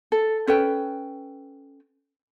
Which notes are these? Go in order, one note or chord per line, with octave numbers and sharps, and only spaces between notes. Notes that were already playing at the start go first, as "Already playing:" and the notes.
A4
C#4 A4 B4 G5